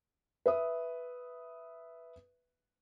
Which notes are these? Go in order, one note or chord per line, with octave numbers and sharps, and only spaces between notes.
B4 E5 D#6